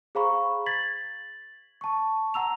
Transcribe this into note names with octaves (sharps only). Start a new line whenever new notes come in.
G#4 C5 F5 A#5 B5 C#6
G#6 A6 B6 F#7
A5 C#6
F#5 A#5 E6 F7